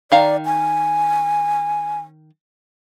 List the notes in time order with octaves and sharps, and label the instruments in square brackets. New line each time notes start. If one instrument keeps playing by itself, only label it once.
[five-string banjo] D#3 F5 A#5 [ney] D5
[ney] G#5